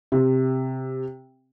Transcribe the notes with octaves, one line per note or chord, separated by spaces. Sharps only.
C3